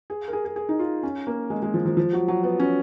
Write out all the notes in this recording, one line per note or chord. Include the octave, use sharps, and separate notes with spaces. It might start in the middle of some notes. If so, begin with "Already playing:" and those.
G#4
A#4
G#4
G#4
G#4
D#4
F4
C#4
A#3
G#3
G#3
F3
F3
F3
F#3
F#3
B3
C#4